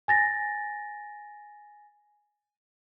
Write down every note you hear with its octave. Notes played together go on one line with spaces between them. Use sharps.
G#5 A6 A#6